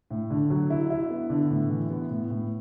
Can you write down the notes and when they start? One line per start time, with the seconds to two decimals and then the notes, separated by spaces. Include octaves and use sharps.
0.11 A2
0.30 D3
0.50 F#3
0.70 E4
0.90 E4
1.10 B3
1.30 D3
1.50 A2
1.70 E3
1.90 B3
2.10 A2
2.30 A2